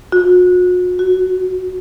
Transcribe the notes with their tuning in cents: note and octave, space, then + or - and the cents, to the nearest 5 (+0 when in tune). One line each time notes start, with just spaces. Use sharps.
F#4 -40
F#4 +5